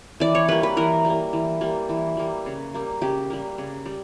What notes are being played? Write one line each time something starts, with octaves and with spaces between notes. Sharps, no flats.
E3 D5
C#5
G3 A#3 B4
B4
E3 A#4
G3 A#3
E3
G3 A#3
E3
G3 A#3
C#3
G3 A#3
C#3 G4
G3 A#3
C#3
G3